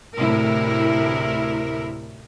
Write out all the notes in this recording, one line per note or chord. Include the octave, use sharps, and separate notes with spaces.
D2 A2 C3 E4 A#4